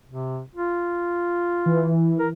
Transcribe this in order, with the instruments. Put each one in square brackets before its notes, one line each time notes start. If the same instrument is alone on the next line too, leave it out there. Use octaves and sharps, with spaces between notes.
[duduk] C3
F4
[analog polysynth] E3
[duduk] A#4